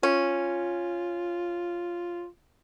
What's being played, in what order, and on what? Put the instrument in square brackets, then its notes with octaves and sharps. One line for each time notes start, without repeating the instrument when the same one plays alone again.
[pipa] C#4 [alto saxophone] F4